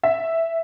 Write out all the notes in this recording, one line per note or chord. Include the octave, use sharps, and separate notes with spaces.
E5